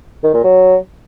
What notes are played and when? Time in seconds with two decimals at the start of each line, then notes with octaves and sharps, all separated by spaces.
0.24 D#3
0.34 A#2
0.44 F#3